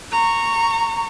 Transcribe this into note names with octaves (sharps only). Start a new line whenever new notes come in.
A#5 C#6